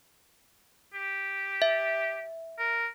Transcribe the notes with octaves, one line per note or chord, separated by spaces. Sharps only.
G4
E5
A#4